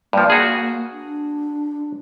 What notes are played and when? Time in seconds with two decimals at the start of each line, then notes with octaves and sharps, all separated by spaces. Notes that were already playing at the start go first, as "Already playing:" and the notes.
0.13 G2 F3 A#3
0.30 F#4 G#4
0.92 D4